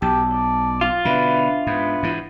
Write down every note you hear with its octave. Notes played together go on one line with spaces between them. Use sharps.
B1 G4 A5
D5
F4
B2 D3 D4 B4 E5
G#2 B3
G#2 E3